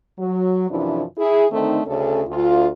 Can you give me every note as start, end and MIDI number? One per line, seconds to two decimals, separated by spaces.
0.18 0.67 54
0.69 1.03 42
0.69 1.03 48
0.69 1.03 52
0.69 1.03 53
0.69 1.03 62
0.69 1.03 64
1.18 1.45 64
1.18 1.45 68
1.50 1.80 50
1.50 1.80 51
1.50 1.80 57
1.50 1.80 60
1.50 1.80 63
1.86 2.21 38
1.86 2.21 49
1.86 2.21 61
1.86 2.21 69
2.27 2.68 38
2.27 2.68 65